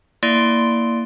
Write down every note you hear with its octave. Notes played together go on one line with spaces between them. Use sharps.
A#3 E4 D5 C6 D7